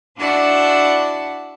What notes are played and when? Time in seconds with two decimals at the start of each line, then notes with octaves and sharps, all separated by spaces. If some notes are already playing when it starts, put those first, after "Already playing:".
0.17 D4 E4 F#4 D5 F#5 A5